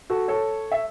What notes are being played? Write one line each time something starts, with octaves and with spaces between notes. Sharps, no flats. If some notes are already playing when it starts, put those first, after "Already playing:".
F#4 A4
A4 C#5
E5